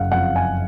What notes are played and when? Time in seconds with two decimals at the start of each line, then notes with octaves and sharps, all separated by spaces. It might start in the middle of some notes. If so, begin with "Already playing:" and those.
Already playing: F#1 C#3 F5 F#5
0.12 F2 F#5
0.36 G#5